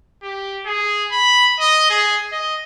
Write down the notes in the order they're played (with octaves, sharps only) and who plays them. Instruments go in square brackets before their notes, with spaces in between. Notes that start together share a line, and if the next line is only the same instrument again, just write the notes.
[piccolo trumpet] G4
G#4
B5
D#5
G#4
D#5